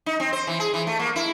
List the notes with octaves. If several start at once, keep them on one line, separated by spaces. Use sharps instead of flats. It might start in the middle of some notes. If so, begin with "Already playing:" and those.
D#4
C4
C5
E3
G#4
E3
A3
A#3
E4